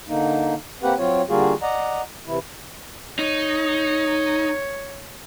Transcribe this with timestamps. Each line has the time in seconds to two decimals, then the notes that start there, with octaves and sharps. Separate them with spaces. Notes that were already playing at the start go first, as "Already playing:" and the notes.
0.09 D3 A#3 D#4
0.83 A#3 C4 G4 B4 F#5
0.99 F#3 C4 F4 C#5
1.29 D3 G3 A#3 F4 F#4 G#4
1.62 D5 D#5 F#5 A#5
2.27 C3 E3 E4
3.19 D#4 C#5